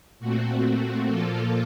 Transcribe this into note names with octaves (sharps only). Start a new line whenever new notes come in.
A#2 A3 C4 F#4
A#2 F3 A#3 F4 A4